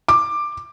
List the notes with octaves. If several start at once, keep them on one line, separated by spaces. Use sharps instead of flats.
D6